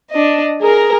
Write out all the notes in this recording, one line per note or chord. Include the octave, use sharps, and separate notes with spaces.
D4 D#5
G#4 A#4 A#5